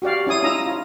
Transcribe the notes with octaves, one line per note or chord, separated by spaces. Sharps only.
F#4 G4 D5 F5
C#4 E4 G#5 D#6
C#4 D#4 F4 A#5 D#6 E6
F4